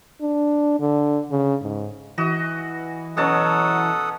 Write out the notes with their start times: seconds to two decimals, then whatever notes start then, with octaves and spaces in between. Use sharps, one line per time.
0.21 D4
0.80 D3
1.31 C#3
1.62 G#2
2.18 E3 F#4 D#5
3.17 B2 F#3 C#4 A4 F#5 A5 D#6